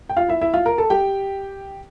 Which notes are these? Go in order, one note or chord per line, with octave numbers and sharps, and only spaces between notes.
G5
F4 F5
E4 E5
E4 E5
F4 F5
A#4 A#5
A4 A5
G4 G5